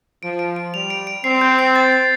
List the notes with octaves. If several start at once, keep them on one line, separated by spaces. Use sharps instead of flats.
F3 D7
D7
D7
G3 F7
D7
D7
C4 C7
G6
C7
A6
A6